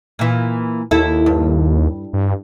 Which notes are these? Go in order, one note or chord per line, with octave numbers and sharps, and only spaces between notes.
A#2 E3
D#2 E4 A4
G2
G2